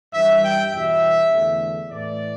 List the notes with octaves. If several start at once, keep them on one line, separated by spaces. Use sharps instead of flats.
G2 E3 G3 E5
G5
E2 B2 G3 E5
E2 D3 A3
A2 E3 A3 D5